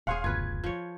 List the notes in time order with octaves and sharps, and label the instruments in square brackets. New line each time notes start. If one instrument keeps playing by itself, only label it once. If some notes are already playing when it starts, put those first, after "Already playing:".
[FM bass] D#1 [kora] G#4 C#5 F#5 [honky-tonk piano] F5 C6
[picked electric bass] F#1 D2 B2 [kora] F4 B4 [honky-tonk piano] G#6
[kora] F3 C#5